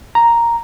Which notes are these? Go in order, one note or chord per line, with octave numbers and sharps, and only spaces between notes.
A#5